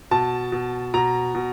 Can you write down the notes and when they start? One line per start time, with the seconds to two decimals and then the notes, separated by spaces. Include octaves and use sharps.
0.11 B2 A5
0.52 B2
0.94 B2 A#5
1.35 B2